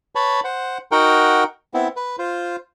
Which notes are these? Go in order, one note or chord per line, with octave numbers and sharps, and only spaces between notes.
B4 C#5 A5 B5
C5 F#5
D#4 F#4 A#4 F#5 G5
B3 C4 E4
B4
F4 C5